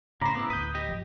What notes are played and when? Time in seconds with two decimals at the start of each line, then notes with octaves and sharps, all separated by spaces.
0.21 A2 C#3 C5 A#5 B5 D6
0.35 B3 E4
0.50 D2 A2 B4 D#6 G6
0.75 G4 D#5
0.89 G1 F3